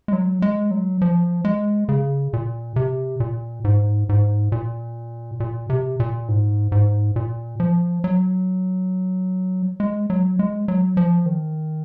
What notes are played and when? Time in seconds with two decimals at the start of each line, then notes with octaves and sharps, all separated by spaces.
0.08 G#3
0.13 F#3
0.42 G#3
0.71 F#3
1.02 F3
1.45 G#3
1.89 C#3
2.33 A#2
2.76 C3
3.20 A#2
3.64 G#2
4.09 G#2
4.52 A#2
5.40 A#2
5.70 C3
6.00 A#2
6.29 G#2
6.72 G#2
7.16 A#2
7.60 F3
8.04 F#3
9.80 G#3
10.10 F#3
10.39 G#3
10.68 F#3
10.97 F3
11.26 D#3